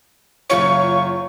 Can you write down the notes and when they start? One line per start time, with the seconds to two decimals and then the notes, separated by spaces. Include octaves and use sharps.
0.50 F#1 F4 C#5 C#6